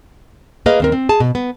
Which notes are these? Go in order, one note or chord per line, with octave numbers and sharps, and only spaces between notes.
A#3 G#4 B4 D#5 F5
D#2 C4 A#4
C4
G#4 A5
B2
B3